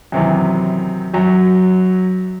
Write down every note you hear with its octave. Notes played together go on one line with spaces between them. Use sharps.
F#2 C3 D#3 E3
F#2 F#3